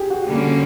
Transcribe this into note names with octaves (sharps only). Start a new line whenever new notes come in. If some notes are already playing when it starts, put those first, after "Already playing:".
Already playing: G4 G#4
F#4
D3 G3 A#3 C#4